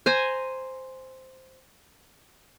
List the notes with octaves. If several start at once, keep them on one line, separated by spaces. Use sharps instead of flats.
C5 G#5 A#5